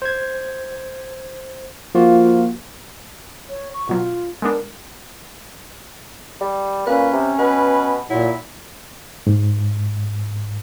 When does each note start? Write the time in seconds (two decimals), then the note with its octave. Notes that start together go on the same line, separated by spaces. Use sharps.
0.02 C5 G#6
1.95 F3 A#3 F4 F#4
3.49 C#5
3.74 C#6
3.89 B2 F#3 F4
4.42 G#3 B3 D4 A#4
6.41 G3
6.87 A#2 C#4 B4
7.13 C3
7.39 B2 B4
8.10 A#2 F#3 E4
9.27 G#2